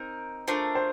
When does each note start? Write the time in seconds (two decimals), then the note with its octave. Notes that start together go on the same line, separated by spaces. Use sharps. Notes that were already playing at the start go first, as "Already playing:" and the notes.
Already playing: C4 D#4 A#4
0.48 A3 D4 F4 A#4 C5
0.75 C5